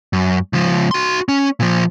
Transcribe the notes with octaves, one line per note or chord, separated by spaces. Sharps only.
F#2
C#2 F3
F#4 C6
C#4
A#2 F3